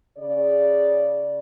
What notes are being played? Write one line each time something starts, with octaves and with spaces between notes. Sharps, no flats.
C#3 D5